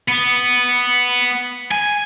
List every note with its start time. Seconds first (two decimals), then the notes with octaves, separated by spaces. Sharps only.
0.09 B3
1.72 G#5